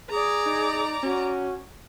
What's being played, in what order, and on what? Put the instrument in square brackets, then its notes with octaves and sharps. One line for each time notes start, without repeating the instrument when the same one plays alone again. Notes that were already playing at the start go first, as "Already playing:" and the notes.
[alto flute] G#4 [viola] D5 A#5
[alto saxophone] D#4
[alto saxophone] C#4 [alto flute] F#4